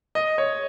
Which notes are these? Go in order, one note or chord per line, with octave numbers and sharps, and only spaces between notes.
D#5
C#5